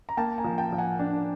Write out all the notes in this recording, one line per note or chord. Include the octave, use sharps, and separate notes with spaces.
A#5
A#3 G5 A5
G#5 A#5
F3
G5 A5
F3
F#5 G#5
D4